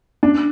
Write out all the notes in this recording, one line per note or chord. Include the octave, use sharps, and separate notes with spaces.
D4